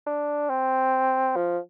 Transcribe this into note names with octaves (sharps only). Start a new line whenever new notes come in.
D4
C4
F3